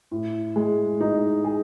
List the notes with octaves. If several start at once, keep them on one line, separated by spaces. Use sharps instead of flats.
A2
G#3
D#4
G#4